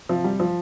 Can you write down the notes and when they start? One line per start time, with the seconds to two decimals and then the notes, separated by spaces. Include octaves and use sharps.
0.09 C3 F3
0.24 G3
0.40 F3